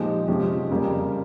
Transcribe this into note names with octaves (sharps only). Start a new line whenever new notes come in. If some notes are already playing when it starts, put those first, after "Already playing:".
Already playing: A#2 F3 G#3 D#4 G4
C3 F3 G#3 C#4 G4
F2 C#3 G3 A#3